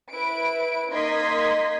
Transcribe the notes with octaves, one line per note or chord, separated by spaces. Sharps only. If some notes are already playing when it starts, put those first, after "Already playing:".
E4 B4 D7
A#3 D#4 D#5 C6 G#6 B6